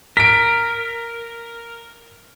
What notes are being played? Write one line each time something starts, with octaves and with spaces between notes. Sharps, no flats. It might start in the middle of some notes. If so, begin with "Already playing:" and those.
A#4 B6 D7